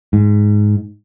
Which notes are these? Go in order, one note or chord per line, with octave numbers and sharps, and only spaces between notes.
G#2